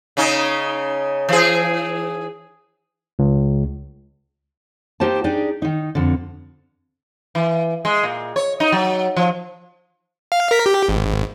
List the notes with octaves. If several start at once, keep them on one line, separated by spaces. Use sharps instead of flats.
C#3 C#4 D#4
E3 G#4
C#2
A#3 D#4 G4 C5 G5 A5
D4 D#4 G4 G#4 D5
D#3 D#4
F2 D3
E3
G#3
A#2
C#5
D#4
F#3
F3
F5
A#4 B6
G4
G#1